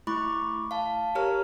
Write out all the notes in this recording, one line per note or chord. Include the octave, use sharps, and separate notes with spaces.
A3 E4 B5 C#6 D6
F5 A5
G4 A#4 C#5 A#5 F6